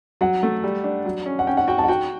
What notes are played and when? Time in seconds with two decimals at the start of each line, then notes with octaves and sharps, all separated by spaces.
0.21 F#3 F#5
0.43 A3
0.64 G3
0.84 D4
1.05 F#3
1.26 C#4
1.39 F#5
1.47 C#4 G5
1.57 F#5
1.68 F#4 G5
1.78 A5
1.84 F#5
1.88 F#4 G5